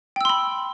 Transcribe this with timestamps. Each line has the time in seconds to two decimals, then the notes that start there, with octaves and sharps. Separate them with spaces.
0.16 G5
0.21 E6
0.25 C6
0.29 B5